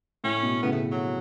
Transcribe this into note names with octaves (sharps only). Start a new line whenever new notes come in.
A2 C#4
B2
A2 C#3 B3
A3
F#3